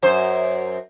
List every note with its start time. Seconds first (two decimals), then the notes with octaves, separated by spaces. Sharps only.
0.02 F#2 C5